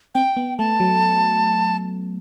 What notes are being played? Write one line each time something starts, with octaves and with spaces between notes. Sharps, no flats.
C4 G5
B3
A3 A5
F#3